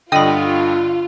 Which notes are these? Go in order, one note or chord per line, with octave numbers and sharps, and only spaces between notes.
G2 D3 F4 D#5 G5 B5 D#6